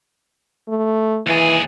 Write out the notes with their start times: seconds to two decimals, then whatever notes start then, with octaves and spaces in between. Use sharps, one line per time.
0.68 A3
1.27 D#2 E3 G#4